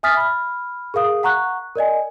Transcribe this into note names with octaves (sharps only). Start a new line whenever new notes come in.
E5 G#5 D#6 F6 A6 B6
B5 F6
G#4 A#4 F5 D#6
F#5 A#5 C#6 F#6
A#4 D5 D#5 G#5